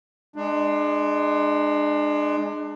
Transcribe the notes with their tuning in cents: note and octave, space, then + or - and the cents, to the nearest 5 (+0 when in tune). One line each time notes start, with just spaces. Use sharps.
G#3 +0 D4 +30